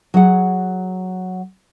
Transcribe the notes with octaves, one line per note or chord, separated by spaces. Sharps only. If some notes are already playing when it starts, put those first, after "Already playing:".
F#3 G#4 F#5